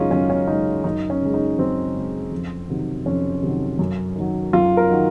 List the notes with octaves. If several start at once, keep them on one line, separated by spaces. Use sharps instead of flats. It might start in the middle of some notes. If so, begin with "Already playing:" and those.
Already playing: F#2 C#3 G#3 C#4 D#4 F4
F#2 C#4
C#4
C#3 G#3 D#4
F#2 D#4
C#4
C#3 G#3
D#4
F#2 C4
C#3 G#3
F2
C3 D#3 F#3
F2 C#4
C3 D#3 F#3
F#2
D#3 F#3
F#2 F4
A#4
D#3 F#3